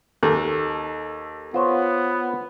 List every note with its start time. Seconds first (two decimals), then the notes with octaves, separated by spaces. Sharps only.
0.23 D#2 A4
1.54 B3 F4 C5 C#5